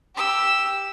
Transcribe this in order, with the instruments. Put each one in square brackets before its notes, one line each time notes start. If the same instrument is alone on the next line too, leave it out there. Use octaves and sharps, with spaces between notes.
[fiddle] G4 E6